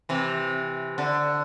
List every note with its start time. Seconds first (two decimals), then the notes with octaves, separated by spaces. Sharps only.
0.09 C3 E3
0.98 D3